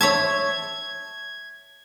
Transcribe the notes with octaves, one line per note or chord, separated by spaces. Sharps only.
C#5 E5 A5 G#6